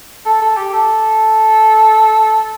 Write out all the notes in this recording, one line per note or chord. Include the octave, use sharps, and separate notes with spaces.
A4
A4
G4
A4